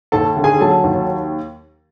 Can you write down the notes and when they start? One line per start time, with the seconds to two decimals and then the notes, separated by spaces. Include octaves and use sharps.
0.12 D#2 A4 A5
0.37 D3
0.44 G#4 G#5
0.60 F#3 A4 A5
0.84 D#2